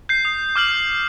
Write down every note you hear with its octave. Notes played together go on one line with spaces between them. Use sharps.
G6 C7
D#6
D6 F6 G6 F#7